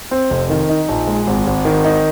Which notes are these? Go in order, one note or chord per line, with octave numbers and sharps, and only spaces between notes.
C4
F1
D#3
D#4
A#1
G#3
G#1
G#1
D#3
D#4